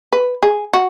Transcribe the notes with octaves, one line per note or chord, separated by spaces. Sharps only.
B4
G#4
F#4